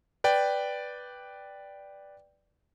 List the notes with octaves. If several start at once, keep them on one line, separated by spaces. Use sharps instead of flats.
B4 D5 G5